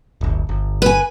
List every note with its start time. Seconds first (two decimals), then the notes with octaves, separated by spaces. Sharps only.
0.21 D1 G1
0.49 G1
0.82 B4 G#5